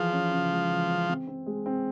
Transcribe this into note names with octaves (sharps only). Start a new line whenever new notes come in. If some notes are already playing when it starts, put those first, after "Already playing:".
Already playing: E3 F3 G#4
C#4
C#3
G#3
E3
C#4
C4
C4
G#3
C4